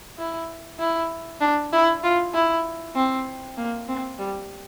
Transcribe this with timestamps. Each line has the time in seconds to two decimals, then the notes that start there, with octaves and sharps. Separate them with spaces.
0.18 E4
0.80 E4
1.41 D4
1.73 E4
2.03 F4
2.34 E4
2.96 C4
3.58 A#3
3.88 C4
4.19 G3